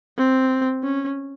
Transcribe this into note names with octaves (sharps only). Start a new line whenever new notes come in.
C4
C#4